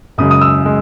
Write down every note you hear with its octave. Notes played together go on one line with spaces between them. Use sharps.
F#2 C#3 G#3 D#6
D#6
E6
G#3